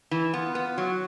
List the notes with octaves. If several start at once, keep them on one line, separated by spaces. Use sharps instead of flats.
E3
B3 F4
B3
F#3 F#4